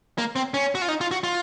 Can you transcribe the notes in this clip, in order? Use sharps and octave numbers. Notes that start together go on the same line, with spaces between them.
A#3
C4
C#4
F#4
F4
D#4
F4
F#4
F4